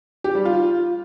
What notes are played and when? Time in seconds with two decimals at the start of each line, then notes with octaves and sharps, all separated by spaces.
0.24 G4
0.35 G3
0.45 F4